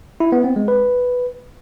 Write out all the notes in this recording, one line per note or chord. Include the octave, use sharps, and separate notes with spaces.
E4
B3
C4
G#3
B4